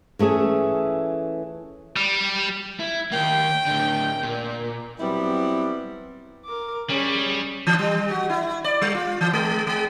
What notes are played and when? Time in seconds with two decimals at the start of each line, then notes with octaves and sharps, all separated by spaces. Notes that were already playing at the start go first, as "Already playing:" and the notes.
0.19 E3 A3 C#4 G#4
1.96 G3
2.80 E4
3.12 D#3 A#3 G5
3.66 A2 D3
4.23 A#2
5.00 F#3 G3 B3 C4 E4
6.45 A#4 D6
6.89 G3 C#4 G#4
7.67 E3
7.79 G3
8.11 F#4
8.30 E4
8.64 D5
8.82 G3
8.94 F4
9.21 E3
9.33 G#3
9.67 G#3